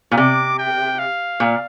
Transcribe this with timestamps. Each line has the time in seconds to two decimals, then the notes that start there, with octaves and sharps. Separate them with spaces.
0.11 A#2
0.17 C3 D6
0.59 G5
0.99 F5
1.40 A#2